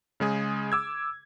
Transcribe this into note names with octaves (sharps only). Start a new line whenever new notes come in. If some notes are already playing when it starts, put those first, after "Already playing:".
C#3 G#3 G#4
D6 E6 G#6